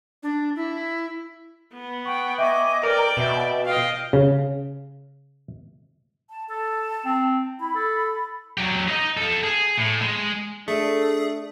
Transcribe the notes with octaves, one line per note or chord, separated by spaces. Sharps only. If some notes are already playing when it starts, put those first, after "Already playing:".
D4
E4
B3
F#5 G5 C#6
D#5 E5 G5 G#5 C#6 D6
A#4 B4 D5 G5 A6
B2 E5
F4 D#5 F5 G5
C#3
A5
A4 A5
C4
E4 B5
A4
F#3 G4
D#4 D#5
F4 A4
G#4
A2
G#3
A3 D4 G#4 A4